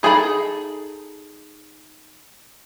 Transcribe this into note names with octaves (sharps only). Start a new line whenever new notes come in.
D#4 G#4 A4 G5 B5